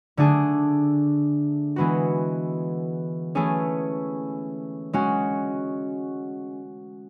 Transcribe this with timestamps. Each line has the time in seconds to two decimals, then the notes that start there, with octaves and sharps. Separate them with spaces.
0.17 D3 A3 D4 G#4
1.76 E3 G#3 B3 F#4
3.35 E3 A3 C#4 G#4
4.93 G#3 C#4 F#4